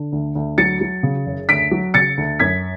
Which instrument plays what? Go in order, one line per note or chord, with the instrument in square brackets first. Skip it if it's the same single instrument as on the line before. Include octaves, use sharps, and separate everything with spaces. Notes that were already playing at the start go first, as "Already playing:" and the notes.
Already playing: [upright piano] D3
D2
D2
F#3 A6 C#7
F#3
C#3
F#1
D2 B6 D7
F#3
C#3 A6 C#7
D2
F#2 G#6 B6